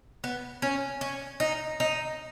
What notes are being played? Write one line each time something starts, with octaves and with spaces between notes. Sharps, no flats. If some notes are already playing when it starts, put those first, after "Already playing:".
B3
C#4
C#4
D#4
D#4